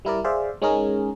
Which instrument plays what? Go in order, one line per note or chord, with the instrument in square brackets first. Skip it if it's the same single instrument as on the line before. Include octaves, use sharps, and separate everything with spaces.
[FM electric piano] G3 E4 A#4 D5
G#4 C5 D5 E5 F5
G#3 C#4 D#4 G#4 A#4